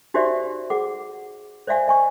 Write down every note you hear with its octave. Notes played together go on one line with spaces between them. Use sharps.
D#4 F#4 G4 C5 D5 E5
G#4 F#5 D6
C5 D5 E5 F5 G#5
D#5 G#5 C#6